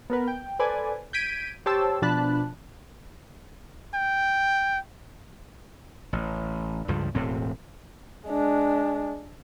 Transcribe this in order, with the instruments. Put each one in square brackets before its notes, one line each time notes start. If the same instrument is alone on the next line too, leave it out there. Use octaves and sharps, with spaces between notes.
[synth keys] B3 A#4 B4
G5
A4 B4 C5 D5 G#5
G6 G#6 B6 D7 D#7
G4 C5 C#5 A5 E6
B2 F3 D4 A5 B5 F#6
[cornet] G5
[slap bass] A1
C#2 G2 F3
E1 A2 C4
[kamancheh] G#3 D4